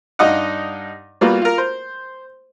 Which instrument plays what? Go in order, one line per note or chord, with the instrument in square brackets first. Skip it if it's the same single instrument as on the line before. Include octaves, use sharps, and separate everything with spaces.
[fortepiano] G2 D#4 D#5 F5 F#5
G3 A#3 B3 F4 F#4
F4 A#4
C5